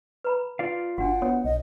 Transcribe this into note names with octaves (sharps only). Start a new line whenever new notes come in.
B4 A#5 B5
F4 D5 F5
G1 D4 F#4 F#5
B3 C#5
B1 D#5